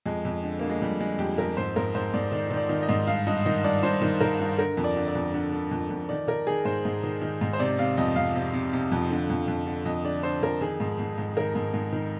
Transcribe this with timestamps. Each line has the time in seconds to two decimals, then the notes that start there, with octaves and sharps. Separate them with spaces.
0.06 F2 G#3
0.25 F2
0.43 D3
0.59 D3 A#3
0.70 G#3
0.82 F2 G3
1.00 D3 G#3
1.19 F2 G4
1.38 F2 A#4
1.57 G#2 C5
1.76 G#2 A#4
1.95 G#2 C5
2.14 G#2 D5
2.32 D#3 D5
2.51 D#3
2.57 D5
2.69 D#3
2.83 D#5
2.89 G#2
3.07 G2 F5
3.26 G2 D#5
3.45 D#3 D#5
3.64 G2 D5
3.83 G2 C5
4.02 D#3
4.21 D#3 A#4
4.39 G2
4.59 D3 A#4
4.77 F2
4.84 D5
4.97 D3
5.08 D5
5.15 F2
5.34 D3
5.52 D3
5.71 F2
5.90 F2
6.09 D#3 D5
6.28 D#3 A#4
6.47 D#3 G#4
6.65 G#2 C5
6.85 G#2
7.04 D#3
7.22 D#3
7.41 G#2
7.53 C5
7.59 C3 D5
7.79 C3 F5
7.97 F2 D#5
8.16 F2 F5
8.35 C3
8.53 C3
8.73 C3
8.92 F2
9.11 D3
9.30 F2
9.48 F2
9.66 D3
9.85 F2 D#5
10.05 D3 D5
10.23 D3 C5
10.42 F2 A#4
10.61 D#3 G#4
10.80 G#2
11.00 G#2
11.18 G#2
11.37 D#3 A#4
11.55 G#2
11.74 G#2
11.93 D#3